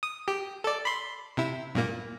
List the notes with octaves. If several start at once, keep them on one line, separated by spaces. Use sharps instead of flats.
D#6
G4
A4 D5
B5 C6
C3 E4
G2 A#2 A#3